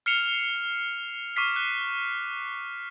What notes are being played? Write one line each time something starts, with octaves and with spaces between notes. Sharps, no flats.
F6 C7 C#7 E7 F7
C#6 D6 F6 B6 C7
F#6